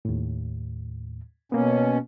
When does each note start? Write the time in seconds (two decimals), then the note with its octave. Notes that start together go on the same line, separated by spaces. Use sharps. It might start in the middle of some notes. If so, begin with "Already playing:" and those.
0.05 D#2 A2
1.52 B2 A#3 B3 C#4